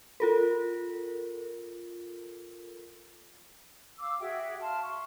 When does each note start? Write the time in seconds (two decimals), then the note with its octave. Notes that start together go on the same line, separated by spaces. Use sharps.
0.20 F4 A4 A#4
3.98 F5 D6 E6
4.20 F#4 G#4 E5 G5
4.60 F5 A5 C6 F6
4.82 C6 C#6